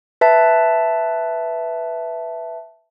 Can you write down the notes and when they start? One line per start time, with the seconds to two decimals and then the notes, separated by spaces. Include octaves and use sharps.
0.21 B4 E5 A5